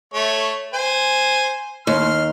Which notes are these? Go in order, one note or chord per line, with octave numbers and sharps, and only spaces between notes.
A3 C#5
C5 G#5
D#2 C6 F6